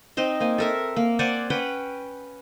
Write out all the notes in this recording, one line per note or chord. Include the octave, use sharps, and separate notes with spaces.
C4 D#4 C5 D#5
A#3 C5 G#5
A4 A#4 E5
A#3
C5 D5 F#5 G#5
C#4 B4 F#5 G5